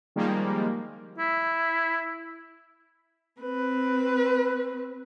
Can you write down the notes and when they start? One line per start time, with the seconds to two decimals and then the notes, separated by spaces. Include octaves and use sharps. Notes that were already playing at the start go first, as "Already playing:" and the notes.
0.16 D#3 F3 G3 G#3 A#3
1.18 E4
3.42 C4 B4